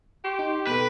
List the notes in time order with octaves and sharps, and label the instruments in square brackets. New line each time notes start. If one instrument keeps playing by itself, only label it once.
[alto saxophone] G4 [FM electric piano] C6 C#6
[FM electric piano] D#4
[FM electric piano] B2 A4 [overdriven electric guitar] B4